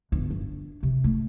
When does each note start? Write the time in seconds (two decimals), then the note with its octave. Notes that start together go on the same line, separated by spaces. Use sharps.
0.12 G1
0.31 D4
0.83 C3
1.04 A3